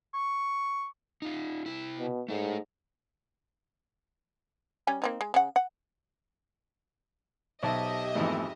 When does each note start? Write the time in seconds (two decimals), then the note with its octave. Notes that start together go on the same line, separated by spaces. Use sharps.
0.14 C#6
1.22 D#4 F4
1.66 C3 E4
1.99 B2
2.28 G#2 A3 A4 C#5
4.87 G3 C#4 G#5
5.02 A#3 C4 D#4
5.21 G#3
5.34 C#3 F#5
5.56 F#5
7.63 B1 G4 C5 D#5 E5 A5
8.15 G#1 F2 E3 A3 B3